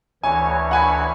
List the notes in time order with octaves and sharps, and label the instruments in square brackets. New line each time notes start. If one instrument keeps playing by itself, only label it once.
[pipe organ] D2 E3 C#5 [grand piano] G#5
[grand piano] F#5 G#5 B5